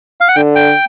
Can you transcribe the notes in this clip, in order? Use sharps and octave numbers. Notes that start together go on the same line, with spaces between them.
F5
F#5
D3 G5
G5